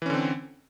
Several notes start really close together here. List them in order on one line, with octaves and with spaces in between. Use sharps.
E3 C#4 D3 C4